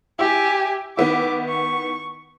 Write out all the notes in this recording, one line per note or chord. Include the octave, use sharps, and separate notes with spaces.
E4 G4 G#5
D#3 B3 E4 D6
C#6